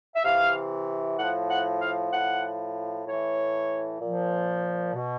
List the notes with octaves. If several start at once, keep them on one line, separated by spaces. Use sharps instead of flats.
E5
C3 E3 F5
A2 F3 F#5
F#5
F5
A2 F3 F#5
A2 E3 C#5
A#2 F3
B2